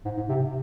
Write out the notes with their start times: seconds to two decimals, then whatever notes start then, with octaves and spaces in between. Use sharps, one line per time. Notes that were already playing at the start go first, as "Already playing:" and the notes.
0.05 G#2
0.17 G#2
0.29 C3